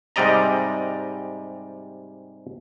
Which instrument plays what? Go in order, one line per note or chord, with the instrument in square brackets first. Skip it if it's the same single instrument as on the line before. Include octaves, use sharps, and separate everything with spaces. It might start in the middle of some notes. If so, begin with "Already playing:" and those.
[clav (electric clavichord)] G#2 C3 G3 D5 D#5 A#5